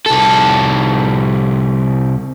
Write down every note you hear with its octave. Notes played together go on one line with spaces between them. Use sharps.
C2 A4